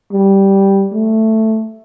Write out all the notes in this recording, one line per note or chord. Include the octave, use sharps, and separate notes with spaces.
G3
A3